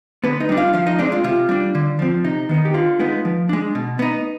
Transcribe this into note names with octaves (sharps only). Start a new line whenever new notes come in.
D3 B3 B4
D#4 D#5
G3 D4
F4 F5
F3 F4 F5
D#4 D#5
G#3 C4 D4 D5
F4
C3 F4
G3 D4
D3
F3 C4
C3 D#4
D#3 B3 D#4
G4
D3 F4
G#3 B3 D#4
F3
G#3 D4
B2
B3 D#4